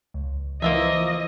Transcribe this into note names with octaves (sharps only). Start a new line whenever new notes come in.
C#2
E3 F3 A#3 F4 D#5 E5